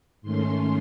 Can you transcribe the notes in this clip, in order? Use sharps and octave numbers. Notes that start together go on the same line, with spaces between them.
G#2 D#3 A3 C#4 C6